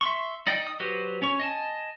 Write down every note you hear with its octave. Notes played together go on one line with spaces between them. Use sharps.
E5 C6 C#6
D#4 D5 D#5 G5
D#6
F#3 F#4 G4 B4 C5
C#4 C#5 C#6
D#5 G#5 A5